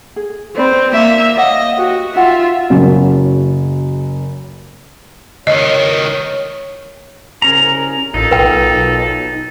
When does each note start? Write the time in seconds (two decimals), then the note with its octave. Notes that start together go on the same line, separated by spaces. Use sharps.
0.16 G#4
0.56 C4 B4 D5 B5
0.93 A#3 E5
1.37 C#5 D#5 F5 F#5
1.77 F#4 G4 B4
2.16 D#4 F4 E5 F#5 G5
2.70 F#1 C#3 F#4
5.47 C#2 D#3 C#5 D#5
7.42 C2 C#3 C#4 A#4 A#5
8.14 A1 A#3 D#4 F4 A4
8.31 B1 B4 G5